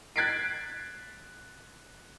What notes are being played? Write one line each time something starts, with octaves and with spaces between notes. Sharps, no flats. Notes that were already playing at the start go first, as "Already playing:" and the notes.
F#6 G#6 A6 B6 C7 D7